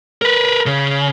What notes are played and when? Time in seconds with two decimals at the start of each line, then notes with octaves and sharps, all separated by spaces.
0.22 A#4 B4
0.66 C#3